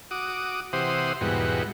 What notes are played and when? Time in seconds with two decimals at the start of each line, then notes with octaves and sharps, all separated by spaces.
0.11 F#4 D6 D#6
0.73 C3 E3 G4 C5 F#5 D#6
1.21 E2 G#2 B2 G3 F#4